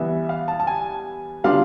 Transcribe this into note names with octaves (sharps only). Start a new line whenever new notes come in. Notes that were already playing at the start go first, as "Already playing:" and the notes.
Already playing: E3 G3 B3 E5
F5
A5
A5
G#5
D3 G3 B3 D4 F4 F5